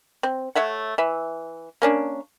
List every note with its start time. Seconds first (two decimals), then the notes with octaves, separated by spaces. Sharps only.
0.23 C4
0.55 A3 C#5 E5 F#5
0.98 E3 E5
1.82 A#3 C#4 D4